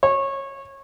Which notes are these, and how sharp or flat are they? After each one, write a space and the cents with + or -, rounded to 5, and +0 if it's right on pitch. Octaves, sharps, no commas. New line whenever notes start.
C#5 -20